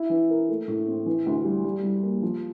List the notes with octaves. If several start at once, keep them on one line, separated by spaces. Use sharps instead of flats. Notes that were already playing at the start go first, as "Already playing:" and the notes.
Already playing: E4
E3
A#4
A3
A2
C4
E3
D2
G3
G3
C2
A#3
F3